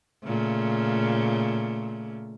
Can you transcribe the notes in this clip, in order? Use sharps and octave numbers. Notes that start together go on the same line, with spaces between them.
A#2 C#3 A3